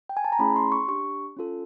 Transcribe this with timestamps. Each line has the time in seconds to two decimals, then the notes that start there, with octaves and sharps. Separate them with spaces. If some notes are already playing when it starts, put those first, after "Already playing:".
0.09 G5
0.17 G#5
0.25 A5
0.32 A#5
0.39 A3 C#4 E4 G#4 B5
0.56 C6
0.72 C#6
0.88 D4 G4 C#6
1.37 C#4 F4 A4